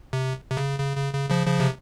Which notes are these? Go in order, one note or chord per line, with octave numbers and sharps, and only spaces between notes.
C3
C3
C#3
C#3
C#3
C#3
C#3 F3
C#3 F3
C3